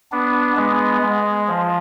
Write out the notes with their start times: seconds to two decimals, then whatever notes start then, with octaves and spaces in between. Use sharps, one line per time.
0.12 B3 D4
0.57 G#3 B3
1.02 G#3
1.48 F3